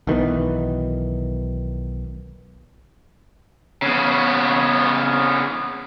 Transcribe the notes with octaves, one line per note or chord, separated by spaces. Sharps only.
B1 D#3 E3 B3
C#3 B3